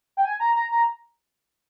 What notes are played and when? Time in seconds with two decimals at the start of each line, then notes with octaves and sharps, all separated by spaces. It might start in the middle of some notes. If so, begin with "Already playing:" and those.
0.17 G5
0.25 G#5
0.40 A#5
0.55 A#5
0.71 A#5